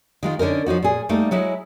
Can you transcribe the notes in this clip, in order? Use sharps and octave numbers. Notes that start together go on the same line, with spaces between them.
D#3 G#3 F4
D3 C#4 D#4 A#4
F3 C#4 D#4 F#4
A#2 G#4
G3 A3 A#3 D#4
F#3 G#3 E4